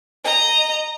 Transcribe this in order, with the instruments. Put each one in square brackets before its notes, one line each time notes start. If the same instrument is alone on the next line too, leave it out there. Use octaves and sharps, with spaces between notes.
[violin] D#5 A#5